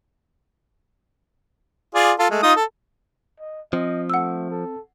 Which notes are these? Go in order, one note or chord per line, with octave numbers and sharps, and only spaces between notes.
F4 G#4 D5
F4 A4
G#3 A3
D#4 F4 D#6
A4
D#5
F3 C4 D#5
A3 F#5 E6
A4